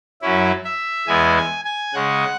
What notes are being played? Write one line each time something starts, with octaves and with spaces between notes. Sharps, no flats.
F#2 F#3 C#4 E4
E5
E2 E3 G#3 B3 E4 G#5
G#5
G#5
C#3 G#3 C#4 F#5